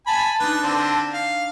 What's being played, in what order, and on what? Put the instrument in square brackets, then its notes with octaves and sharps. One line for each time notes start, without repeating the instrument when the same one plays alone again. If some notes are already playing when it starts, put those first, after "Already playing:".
[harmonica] G#5 B5 [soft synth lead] A5
[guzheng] D4 D#4 [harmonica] B4
[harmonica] D3 C4
F5